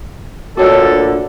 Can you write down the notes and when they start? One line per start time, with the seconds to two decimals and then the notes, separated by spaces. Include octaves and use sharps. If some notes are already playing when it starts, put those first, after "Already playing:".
0.57 D2 A#2 D3 F#4 A4 C#5 D#5